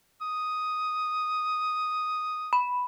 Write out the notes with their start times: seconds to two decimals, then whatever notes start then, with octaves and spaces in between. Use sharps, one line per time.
0.21 D#6
2.53 B5